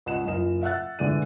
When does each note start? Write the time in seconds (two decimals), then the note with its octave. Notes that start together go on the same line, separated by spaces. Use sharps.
0.06 C#2 D#5 F#5 E7
0.25 F#1 F4 D#5 E7
0.63 E5 F#5 E6 F#6 A6
0.99 D3 E3 G#3 D5 D#7